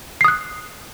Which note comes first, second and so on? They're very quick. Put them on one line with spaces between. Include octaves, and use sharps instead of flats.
C7 D#6 F#6